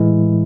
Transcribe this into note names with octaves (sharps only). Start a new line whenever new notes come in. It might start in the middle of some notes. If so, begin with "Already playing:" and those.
Already playing: A2 E3 G#3 E4